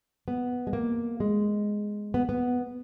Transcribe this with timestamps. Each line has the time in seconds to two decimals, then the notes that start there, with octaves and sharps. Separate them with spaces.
0.28 B3
0.67 G#3
0.73 A#3
1.20 G#3
2.14 B3
2.29 B3